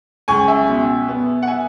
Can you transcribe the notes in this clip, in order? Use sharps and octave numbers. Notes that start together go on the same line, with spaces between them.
C#2 G#5 C#6
E5 G#5
B2
B3
F#5
E5 G#5